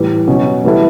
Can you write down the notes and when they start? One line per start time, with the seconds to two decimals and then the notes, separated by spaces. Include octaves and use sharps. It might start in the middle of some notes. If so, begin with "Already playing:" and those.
Already playing: A2 E3 G3
0.27 B2 F#3 C#4
0.64 E3 G3 B3 E4 A4